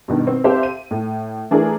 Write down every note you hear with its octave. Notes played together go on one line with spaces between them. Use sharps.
G2 B2 D#3
C4
C4 G4 A4 C5 E5 F5
D#7
A2
E3 A3 D4 E4 G#4 A#4